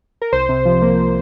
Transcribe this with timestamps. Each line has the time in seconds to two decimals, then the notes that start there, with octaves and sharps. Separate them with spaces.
0.22 A#4
0.33 C2 C5
0.49 C3
0.65 F3
0.82 A#3